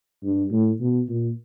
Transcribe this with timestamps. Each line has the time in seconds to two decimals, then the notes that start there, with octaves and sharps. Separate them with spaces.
0.24 G2
0.51 A2
0.80 B2
1.09 A#2